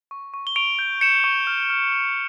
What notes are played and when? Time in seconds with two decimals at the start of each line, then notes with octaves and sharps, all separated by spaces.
0.11 C#6
0.34 C#6
0.47 G7
0.56 C#6 D7 F7
0.79 G6
1.01 G6 C#7 E7
1.24 C#6
1.47 F6
1.70 F6
1.92 F6